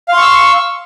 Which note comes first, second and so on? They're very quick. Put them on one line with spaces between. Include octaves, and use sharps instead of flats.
F5 C6 C#6 E6